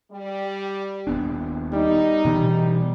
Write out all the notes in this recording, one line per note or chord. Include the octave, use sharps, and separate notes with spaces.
G3
D#1 B3 D4
G3 D#4
B2 E3 G3 B3